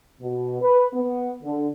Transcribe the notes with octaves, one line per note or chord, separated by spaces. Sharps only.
B2
B4
B3
D3